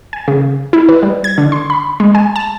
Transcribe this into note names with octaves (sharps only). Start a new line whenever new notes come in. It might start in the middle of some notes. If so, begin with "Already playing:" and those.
G#5
C#3
E4
B4
G3
G#6
D3
C6
B5
G#3
G#5
A5